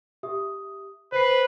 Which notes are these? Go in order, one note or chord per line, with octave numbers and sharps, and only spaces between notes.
G4 E5 D#6
B4 C5 C7